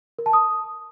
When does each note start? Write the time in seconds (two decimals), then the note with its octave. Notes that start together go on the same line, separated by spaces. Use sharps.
0.19 A#4
0.26 A5
0.33 D#6